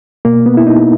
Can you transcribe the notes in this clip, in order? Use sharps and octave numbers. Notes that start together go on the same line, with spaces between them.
B2 A#3
B3
E4
D#4